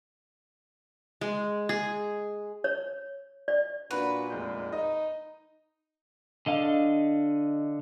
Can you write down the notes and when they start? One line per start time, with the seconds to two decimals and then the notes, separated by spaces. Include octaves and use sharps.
1.21 G#3
1.69 G#4
2.64 C#5
3.48 D5
3.91 A#2 D4 F#4 B4
4.30 F1 G#3 G6
4.72 D#4 D#5
6.46 D3 D#5 F5